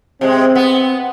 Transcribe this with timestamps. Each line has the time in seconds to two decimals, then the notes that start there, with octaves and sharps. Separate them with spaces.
0.21 C3 G#3 C4
0.55 B3